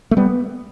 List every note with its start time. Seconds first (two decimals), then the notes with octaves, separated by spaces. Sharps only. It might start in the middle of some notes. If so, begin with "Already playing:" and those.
0.11 A3
0.17 G3 B3